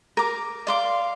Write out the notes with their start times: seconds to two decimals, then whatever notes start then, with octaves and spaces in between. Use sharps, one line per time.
0.17 A#4 D6
0.67 D5 F5 C6 D6